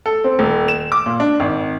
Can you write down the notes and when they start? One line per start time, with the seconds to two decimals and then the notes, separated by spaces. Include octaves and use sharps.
0.06 A4
0.24 C4
0.39 D#1
0.68 E7
0.92 D6
1.06 A#2
1.20 D4
1.40 G#1